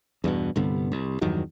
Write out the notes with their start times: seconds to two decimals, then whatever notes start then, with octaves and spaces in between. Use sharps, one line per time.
0.24 E2 G2 B2
0.56 C2 G2 D3 B3
0.92 C2
1.21 E2 G2 D#3 F#3